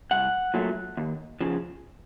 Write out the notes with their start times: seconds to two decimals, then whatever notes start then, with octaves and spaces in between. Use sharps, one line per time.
0.11 C2 F#5
0.54 A#2 F#3 A3
0.97 D#2
1.41 C#3 F3